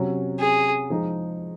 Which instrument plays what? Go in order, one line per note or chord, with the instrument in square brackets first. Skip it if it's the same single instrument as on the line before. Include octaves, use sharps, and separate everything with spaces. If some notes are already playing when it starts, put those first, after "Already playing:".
Already playing: [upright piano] C3 F#3 C#4
[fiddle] G#4
[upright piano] F3 G#3 D#4